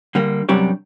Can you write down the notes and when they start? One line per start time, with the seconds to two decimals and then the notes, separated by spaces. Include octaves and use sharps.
0.15 D3 G3 A#3
0.49 F#2 C3 G3 D4 G4 C#5